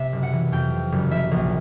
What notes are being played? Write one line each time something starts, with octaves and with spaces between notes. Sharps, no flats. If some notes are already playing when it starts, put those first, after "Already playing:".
Already playing: C3 E5
F#1
F#5
E3
F2 G5
C3
F#1
F3 E5
A#1